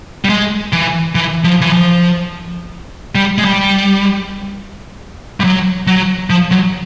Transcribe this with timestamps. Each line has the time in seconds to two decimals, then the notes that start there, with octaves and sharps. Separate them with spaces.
0.25 G3
0.29 G#3
0.73 E3
1.15 E3
1.44 F3
1.61 E3
1.72 F3
3.15 G3
3.38 G#3
3.45 G3
5.40 G3
5.44 F#3
5.87 F#3
6.30 F3
6.51 F#3